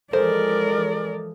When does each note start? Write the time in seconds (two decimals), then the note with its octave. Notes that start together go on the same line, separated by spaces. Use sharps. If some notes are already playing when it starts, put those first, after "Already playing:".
0.13 E3 F3 G#3 A4 A#4 C5 D5